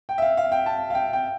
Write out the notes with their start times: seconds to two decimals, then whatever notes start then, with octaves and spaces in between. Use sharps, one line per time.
0.09 G5
0.18 E5
0.22 F5
0.37 F5
0.52 G5
0.66 A5
0.90 F5
0.95 G5
1.13 G5